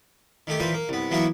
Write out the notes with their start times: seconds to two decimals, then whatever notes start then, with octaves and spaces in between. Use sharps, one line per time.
0.47 D#3 A3 G4
0.60 A#2 E3 B4 C5
0.74 A#3
0.89 C2 B3
1.11 E3 F#3 A#3 B3 E4 C#5